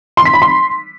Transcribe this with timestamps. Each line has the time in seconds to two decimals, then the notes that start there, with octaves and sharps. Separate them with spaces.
0.17 C6
0.25 B6
0.34 B5
0.42 C6